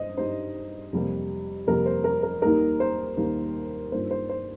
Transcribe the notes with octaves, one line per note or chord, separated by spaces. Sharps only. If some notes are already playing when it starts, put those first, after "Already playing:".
Already playing: G2 G3 C5 D#5
G2 G3 D#4 C5
F2 C3 G3 A#3
F2 C3 G3 A#3 A#4
C5
A#4
A#4
D#2 D#3 G3 A#3 D#4 A#4
C5
D#2 D#3 G3 A#3 D#4
G2 D#3 A#3 F4 C5
C5
C5